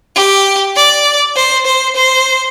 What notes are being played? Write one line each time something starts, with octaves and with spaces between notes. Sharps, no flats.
G4
D5
C5
C5
C5